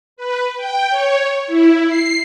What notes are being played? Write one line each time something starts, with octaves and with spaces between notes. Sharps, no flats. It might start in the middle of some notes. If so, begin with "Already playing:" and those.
B4
G5
C#5
E4
C7